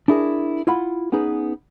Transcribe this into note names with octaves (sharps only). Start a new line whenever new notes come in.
D4 E4 G#4 A#4
E4 F4 F#5 B5
B3 C#4 D#4 G#4 B4